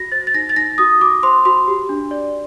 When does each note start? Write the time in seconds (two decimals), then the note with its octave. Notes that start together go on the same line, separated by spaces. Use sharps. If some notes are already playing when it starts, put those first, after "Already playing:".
Already playing: F#4 A#6
0.12 C5 A6
0.27 A6
0.34 D#4 A#6
0.49 A6
0.56 D#4 A#6
0.78 F#4 D#6
1.00 F#4 D6
1.23 C5 C6
1.45 F#4 C6
1.68 G4
1.89 D4
2.11 D5